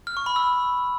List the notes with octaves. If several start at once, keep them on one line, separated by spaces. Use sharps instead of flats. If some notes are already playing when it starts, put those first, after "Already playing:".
F6
C#6
B5
E6